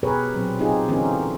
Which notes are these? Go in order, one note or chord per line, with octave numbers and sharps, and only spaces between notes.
B2 G4 G#4 A#4 B4 C#5
A#2 F#3 C4
C3 C4 D#4 F4 G4 G#4
D3 E3 A#3 C4 C#4 D#4